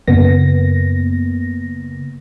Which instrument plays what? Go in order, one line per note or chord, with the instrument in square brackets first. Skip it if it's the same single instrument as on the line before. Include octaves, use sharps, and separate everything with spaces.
[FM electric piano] F#2 C#3 A#3 B3 A#6